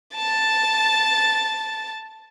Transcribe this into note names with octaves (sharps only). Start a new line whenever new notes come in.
A5 A6